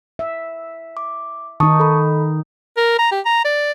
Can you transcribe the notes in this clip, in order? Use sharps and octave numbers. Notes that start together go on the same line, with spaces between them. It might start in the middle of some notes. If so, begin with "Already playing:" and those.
E5
D6
D#3 D#4 A5 C#6 D#6
A4 B5
A#4
A#5
G4
A#5
D5